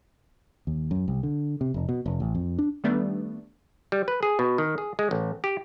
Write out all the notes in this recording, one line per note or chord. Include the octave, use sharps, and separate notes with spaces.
D#2
F#2
C2
D3
C3
F1
B2
F1
A1
F2
D4
D#3 G3 A3 B3 D4
G3
B4
G#4
B2
D#3
G#4
G#3
A1
G4